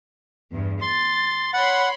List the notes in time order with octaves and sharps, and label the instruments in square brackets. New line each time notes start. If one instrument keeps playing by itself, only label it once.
[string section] E2 G2
[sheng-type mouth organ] C6 [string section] A6
[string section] C#5 B5 C6 [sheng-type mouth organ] F#5